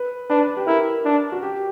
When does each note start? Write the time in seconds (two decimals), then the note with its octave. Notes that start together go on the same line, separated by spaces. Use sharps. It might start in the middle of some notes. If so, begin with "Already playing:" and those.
Already playing: B4
0.30 D4 B4
0.57 G4
0.67 E4 A#4
1.05 D4
1.32 F#4
1.43 G4